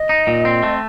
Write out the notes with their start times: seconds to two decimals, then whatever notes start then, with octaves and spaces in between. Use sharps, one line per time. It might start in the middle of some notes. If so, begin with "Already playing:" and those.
Already playing: D#5
0.09 D#4
0.27 A#2
0.45 C4
0.63 A3